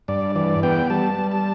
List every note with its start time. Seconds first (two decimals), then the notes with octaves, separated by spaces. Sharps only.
0.08 G2 D5
0.35 E3 D5
0.63 B3 G5
0.90 G3 A5
1.18 G3
1.31 A5